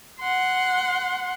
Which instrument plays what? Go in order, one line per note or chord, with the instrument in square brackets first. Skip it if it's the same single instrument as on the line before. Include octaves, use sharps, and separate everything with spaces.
[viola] F#5 C6